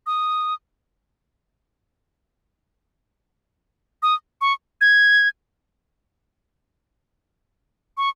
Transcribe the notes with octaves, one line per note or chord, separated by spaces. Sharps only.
D#6
D#6
C#6
G#6
C#6